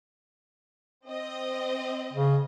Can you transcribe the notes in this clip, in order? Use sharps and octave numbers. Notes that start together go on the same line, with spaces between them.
C4 D#5
C#3